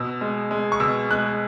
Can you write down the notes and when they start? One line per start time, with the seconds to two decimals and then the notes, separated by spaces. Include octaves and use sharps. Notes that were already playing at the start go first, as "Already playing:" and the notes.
Already playing: B2 E6
0.21 G#3
0.51 G#3
0.72 C#6
0.80 B2 E6
1.11 G#3 F#6